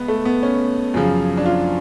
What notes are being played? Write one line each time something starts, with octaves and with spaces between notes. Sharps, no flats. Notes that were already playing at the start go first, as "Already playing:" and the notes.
Already playing: C#2 B3
A3
B3
C#4
F#2 C#3 F3
D4
F4